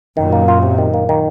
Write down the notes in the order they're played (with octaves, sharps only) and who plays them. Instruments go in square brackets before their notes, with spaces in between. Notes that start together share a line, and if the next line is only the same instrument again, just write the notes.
[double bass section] F#2 A#2 [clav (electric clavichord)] D#3
[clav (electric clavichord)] A#3
F4
C3
D#3
A#3
D#3